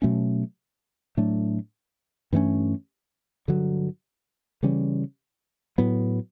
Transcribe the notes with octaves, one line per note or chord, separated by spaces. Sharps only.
B2 F#3 A3 C#4
A2 F#3 A3 D4
G2 E3 A3 C#4
G2 D3 F#3
C#3 E3 G3 C#4
A2 F#3 B3